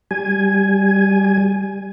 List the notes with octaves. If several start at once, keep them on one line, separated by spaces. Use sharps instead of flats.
G3 G#5